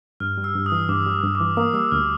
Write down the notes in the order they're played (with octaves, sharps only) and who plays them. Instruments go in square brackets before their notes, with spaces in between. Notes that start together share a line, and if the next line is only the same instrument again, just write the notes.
[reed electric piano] G2 [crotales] F6
[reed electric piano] G3
[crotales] E6
[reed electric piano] G2
[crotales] D#6
[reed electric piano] E3
[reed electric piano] G2 [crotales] D6
[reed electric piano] G3
G2
[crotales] D6
[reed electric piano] E3
[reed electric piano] A#3 [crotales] D#6
[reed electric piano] G3 [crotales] E6
[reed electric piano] D2 [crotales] F6